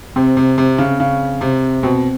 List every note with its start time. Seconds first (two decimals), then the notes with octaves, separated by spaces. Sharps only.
0.16 C3 C4
0.37 C3
0.58 C3
0.78 C#3
1.00 C#3
1.41 C3
1.83 B2 C4